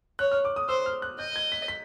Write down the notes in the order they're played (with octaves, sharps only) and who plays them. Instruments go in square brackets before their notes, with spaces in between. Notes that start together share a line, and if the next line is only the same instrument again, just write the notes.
[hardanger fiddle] C#5 [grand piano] F#6
[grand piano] F6
D6
D#6
[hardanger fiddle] C5 [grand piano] E6
[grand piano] F6
F#6
[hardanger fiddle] D#5 [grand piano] G6
[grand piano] G#6
B6
B6